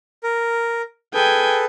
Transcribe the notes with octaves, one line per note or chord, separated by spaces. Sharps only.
A#4
G#4 A4 B4 G5 G#5